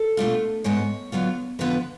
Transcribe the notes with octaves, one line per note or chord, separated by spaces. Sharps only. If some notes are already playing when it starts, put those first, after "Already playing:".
Already playing: A4
B2 A3 D4 F4
G#2 G#3 B3 C#5
D3 F#3 B3 F4
F2 D3 F3 B3 B4